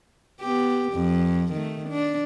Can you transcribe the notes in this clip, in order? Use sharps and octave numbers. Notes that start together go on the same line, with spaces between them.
B3 G4
F2
D#3 A3
D4